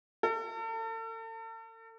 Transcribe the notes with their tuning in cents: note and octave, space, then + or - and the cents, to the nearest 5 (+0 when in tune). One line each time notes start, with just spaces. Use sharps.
A4 +40